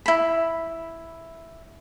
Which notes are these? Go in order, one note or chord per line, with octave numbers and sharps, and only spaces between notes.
E4 B5